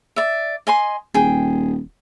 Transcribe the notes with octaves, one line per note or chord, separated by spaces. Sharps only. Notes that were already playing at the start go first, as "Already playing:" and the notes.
D5 E5
D#5 G#5 C6
D#1 G#4 G5